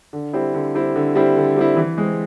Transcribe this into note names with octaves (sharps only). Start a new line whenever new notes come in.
D3
G3 C4 E4
D3
G3 C4 E4
D3
G3 C4 E4
D3
G3 C4 E4
E3
G#3 C4